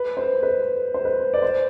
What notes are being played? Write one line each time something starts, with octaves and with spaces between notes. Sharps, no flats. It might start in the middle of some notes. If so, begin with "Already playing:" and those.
Already playing: B4
C5
B4
C5
B4
D5
C5